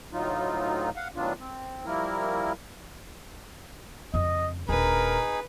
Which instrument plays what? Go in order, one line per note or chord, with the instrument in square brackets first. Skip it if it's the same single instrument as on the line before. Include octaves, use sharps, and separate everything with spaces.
[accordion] D2 A2 F#3 D#4 F4
F5 F#5
A2 D#3 F#3 B3 D4 F4
C4
F3 G3 A#3 E4 A#4
[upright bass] F2 C#3 [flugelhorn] D#5
[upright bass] D#1 D4 [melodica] D#4 G#4 [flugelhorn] A#4 [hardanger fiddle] B4